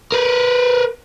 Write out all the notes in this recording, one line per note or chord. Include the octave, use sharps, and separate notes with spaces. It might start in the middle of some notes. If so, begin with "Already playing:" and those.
A#4 B4